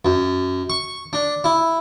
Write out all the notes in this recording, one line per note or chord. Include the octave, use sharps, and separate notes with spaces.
F#2
C#6
D4
E4